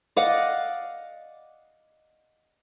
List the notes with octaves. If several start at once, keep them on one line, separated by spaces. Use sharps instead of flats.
D5 D#5 F5 F#5